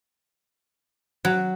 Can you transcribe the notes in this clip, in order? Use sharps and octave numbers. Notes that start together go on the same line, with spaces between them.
F#3